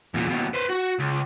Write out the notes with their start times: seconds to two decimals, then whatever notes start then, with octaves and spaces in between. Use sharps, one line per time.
0.14 E2 A#2
0.28 D#2 B2
0.53 B4 C5
0.69 F#4
0.99 C#2